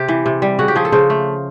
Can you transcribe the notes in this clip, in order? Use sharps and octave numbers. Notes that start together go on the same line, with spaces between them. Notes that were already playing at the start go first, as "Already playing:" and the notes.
Already playing: C3 G4
E3
C3
G3
C#3 F#4
G4
F3 G#4
A4
C#3 C5
A3